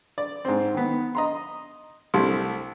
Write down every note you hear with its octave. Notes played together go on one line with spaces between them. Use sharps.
D5
G#2 C4
D#3 B3
D#5 A#5 C6
C2 G3 A3 C6